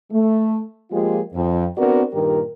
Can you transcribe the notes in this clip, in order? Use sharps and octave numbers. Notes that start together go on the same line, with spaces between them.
A3
F3 G#3 A#3 F4 G4 G#4
F2
B3 C4 D4 F#4 A#4 D5
G2 A#2 D#3 G4 A#4